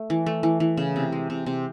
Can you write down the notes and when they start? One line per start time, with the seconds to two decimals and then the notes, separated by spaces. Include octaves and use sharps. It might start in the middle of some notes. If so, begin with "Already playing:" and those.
Already playing: A3
0.10 E3
0.26 A3
0.43 E3
0.60 E3
0.77 C#3
0.96 C3
1.12 G#3
1.30 C3
1.46 C3